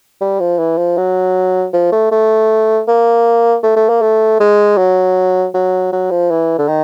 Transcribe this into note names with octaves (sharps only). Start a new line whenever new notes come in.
G3
F3
E3
F3
F#3
F3
A3
A3
A#3
A3
A3
A#3
A3
G#3
F#3
F#3
F#3
F3
E3
D3
D#3